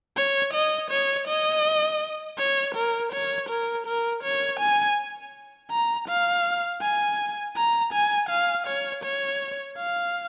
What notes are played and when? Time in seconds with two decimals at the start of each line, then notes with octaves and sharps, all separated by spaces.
0.17 C#5
0.53 D#5
0.91 C#5
1.27 D#5
2.39 C#5
2.75 A#4
3.13 C#5
3.49 A#4
3.87 A#4
4.24 C#5
4.60 G#5
5.71 A#5
6.09 F5
6.82 G#5
7.56 A#5
7.93 G#5
8.29 F5
8.67 C#5
9.04 C#5
9.78 F5